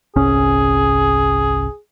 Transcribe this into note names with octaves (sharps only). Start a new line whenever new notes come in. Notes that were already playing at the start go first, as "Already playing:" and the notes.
G1 C2 C#4 G#4